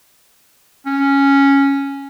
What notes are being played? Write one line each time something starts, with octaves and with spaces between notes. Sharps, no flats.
C#4